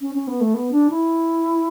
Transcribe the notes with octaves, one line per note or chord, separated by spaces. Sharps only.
C#4
C#4
B3
A3
B3
D4
E4